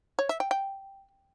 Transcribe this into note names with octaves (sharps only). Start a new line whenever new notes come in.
C#5
E5
G5
G5